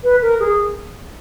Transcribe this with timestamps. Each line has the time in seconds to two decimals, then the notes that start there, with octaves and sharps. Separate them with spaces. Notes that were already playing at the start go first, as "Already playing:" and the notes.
0.03 B4
0.22 A#4
0.40 G#4